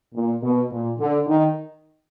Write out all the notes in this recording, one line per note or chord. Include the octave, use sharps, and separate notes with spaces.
A#2
B2
A#2
D3
D#3